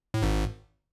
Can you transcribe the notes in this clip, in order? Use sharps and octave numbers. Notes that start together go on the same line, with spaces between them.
A2
G#1 G#2